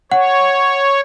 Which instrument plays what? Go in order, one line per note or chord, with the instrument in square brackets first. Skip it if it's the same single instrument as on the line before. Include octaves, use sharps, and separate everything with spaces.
[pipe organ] C#5 [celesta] F#5